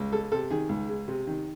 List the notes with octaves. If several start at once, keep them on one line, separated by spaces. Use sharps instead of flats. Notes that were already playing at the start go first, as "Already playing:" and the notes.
Already playing: C#2
G#3 A4
C3 A4
D#3 G#4
C#2
G#3
C3
D#3